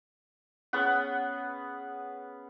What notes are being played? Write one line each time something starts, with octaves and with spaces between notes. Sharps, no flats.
B3 C#4 G#4 F#5